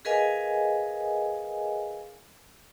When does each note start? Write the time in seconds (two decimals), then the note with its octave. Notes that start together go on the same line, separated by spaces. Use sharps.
0.05 G#4 A#4 B4 D#5 F5 G#5